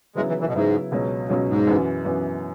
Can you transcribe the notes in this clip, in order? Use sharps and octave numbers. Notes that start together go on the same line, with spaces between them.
C#3 F#3 G#3 B3 E4
E3
E3
B2
G#2 C#3 F#3 B3 E4
C#2 B2 F#3 C#4
C#2 G#2 B2 F#3 C#4
G#2
F#2 E3 B3 F#4
F#2 E3 B3 F#4